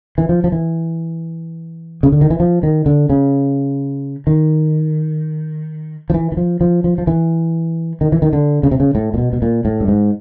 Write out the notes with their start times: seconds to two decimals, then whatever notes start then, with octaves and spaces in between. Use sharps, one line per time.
0.18 E3
0.29 F3
0.44 F3
0.52 E3
2.03 C#3
2.12 D3
2.21 D#3
2.30 E3
2.40 F3
2.63 D#3
2.86 D3
3.10 C#3
4.27 D#3
6.10 F3
6.14 E3
6.32 E3
6.37 F3
6.61 F3
6.84 F3
6.98 F3
7.07 E3
8.01 D#3
8.12 E3
8.22 D#3
8.33 D3
8.63 C#3
8.71 C3
8.80 C#3
8.95 A2
9.14 A#2
9.18 B2
9.33 B2
9.42 A#2
9.65 A2
9.81 G2
9.88 G#2